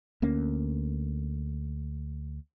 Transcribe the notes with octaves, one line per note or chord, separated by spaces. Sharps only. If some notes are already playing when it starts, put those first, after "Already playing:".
D2 A#3 C#4